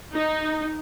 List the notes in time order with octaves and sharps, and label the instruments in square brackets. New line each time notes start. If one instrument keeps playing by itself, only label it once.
[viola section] D#4